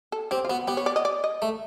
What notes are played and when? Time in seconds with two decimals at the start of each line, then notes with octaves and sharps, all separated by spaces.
0.12 A4
0.31 C4 G4
0.45 F4
0.49 B3 F#4
0.68 B3 G4
0.77 C#5
0.86 D5
0.96 D#5
1.05 D5
1.24 D#5
1.42 A3